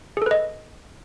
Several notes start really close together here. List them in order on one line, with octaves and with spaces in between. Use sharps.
G#4 A4 B4 D#5